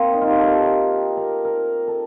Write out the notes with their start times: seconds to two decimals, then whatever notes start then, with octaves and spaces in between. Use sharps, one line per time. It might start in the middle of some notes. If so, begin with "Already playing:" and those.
Already playing: A#3 C4
0.13 D#4
0.21 F4
0.30 G4
0.39 A4
0.48 A#4
1.17 A#4
1.45 A#4
1.88 A4